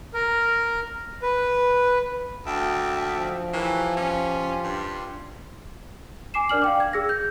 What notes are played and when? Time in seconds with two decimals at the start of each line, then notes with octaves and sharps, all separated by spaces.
0.14 A#4
1.22 B4
2.46 D2 E5 G5 A5
3.16 F3
3.53 E3 G4 A#4 C#5
3.97 C#4 F4 G4 C6
4.63 G2
6.34 G#5 D6 C7 E7
6.49 D4 A#4 D5 F6 F#7
6.62 F5 G5 D6
6.80 G#6
6.93 G#4 E6 A#6
7.09 G6